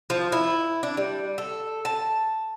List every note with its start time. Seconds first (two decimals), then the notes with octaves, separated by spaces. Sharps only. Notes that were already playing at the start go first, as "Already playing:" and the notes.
0.10 F3
0.32 E4
0.83 D4
0.97 G3
1.38 A4
1.85 A5